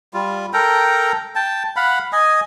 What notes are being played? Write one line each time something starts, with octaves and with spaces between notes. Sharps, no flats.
G3 F4
A4 A#4 G5 A#5
G5 A5
F5 F#5 B5
D#5 G#5